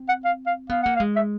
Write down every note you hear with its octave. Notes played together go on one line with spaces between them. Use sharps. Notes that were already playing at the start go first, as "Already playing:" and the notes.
Already playing: C4
F#5
F5
F5
B3 F5
A#3 F#5
F5
G#3
E5